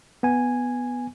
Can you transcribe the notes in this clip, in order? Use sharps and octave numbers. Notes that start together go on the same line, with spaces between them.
B3 G#5